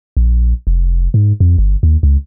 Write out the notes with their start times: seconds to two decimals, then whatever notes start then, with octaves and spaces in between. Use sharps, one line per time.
0.17 A#1
0.67 F1
1.14 G#2
1.40 F2
1.58 G1
1.83 D#2
2.03 C#2